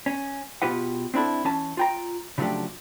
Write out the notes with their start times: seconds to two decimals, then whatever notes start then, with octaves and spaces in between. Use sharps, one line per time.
0.06 C#4
0.62 B2 F4 G4 B4 F#5
1.14 C4 D4 E4 A4
1.44 E3 C#4 A5
1.77 F4 G5 A#5
2.38 C#3 F3 F#3 A3 D4 G4